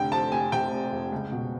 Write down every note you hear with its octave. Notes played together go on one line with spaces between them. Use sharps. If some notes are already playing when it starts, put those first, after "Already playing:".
Already playing: F1 D3 G5
F2 A5
F1 G#5
C3 G5
F1
F2
C#2
B2